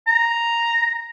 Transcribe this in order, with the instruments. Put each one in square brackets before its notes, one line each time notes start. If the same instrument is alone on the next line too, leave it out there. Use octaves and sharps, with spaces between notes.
[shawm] A#5